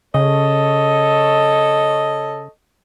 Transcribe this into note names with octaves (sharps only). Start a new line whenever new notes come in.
C#3 A4 C#5 D#5